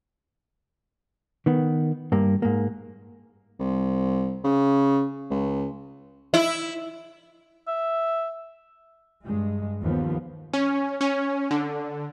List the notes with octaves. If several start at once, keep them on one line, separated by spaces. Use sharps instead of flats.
D#3 B3
G2 A#3
G#2 A#3
C2
C#3
C#2
E4
E5
G2 G#3
D#2 F3 B3
C#4
C#4
D3